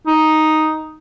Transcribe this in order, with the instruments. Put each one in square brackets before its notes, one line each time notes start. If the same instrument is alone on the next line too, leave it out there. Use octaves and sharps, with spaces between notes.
[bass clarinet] D#4